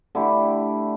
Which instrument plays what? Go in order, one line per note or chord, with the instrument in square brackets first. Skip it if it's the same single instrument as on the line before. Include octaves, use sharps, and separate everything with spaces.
[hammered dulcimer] D3 A3 E4 G4